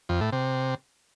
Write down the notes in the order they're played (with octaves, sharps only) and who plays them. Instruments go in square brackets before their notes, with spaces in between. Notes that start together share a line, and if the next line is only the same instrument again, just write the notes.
[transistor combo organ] F2
A2
C3